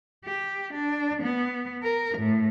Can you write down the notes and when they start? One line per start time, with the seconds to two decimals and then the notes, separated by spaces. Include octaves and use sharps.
0.25 G4
0.74 D4
1.23 B3
1.83 A#4
2.18 A2